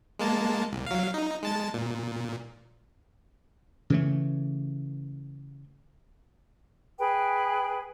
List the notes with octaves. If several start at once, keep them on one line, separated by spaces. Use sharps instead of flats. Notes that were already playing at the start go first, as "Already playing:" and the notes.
G#3 A#3 A5
C2
F#3 F5
D#4
G#3 A5 A6
A#2
C#3 E3 A3
G#4 B4 G5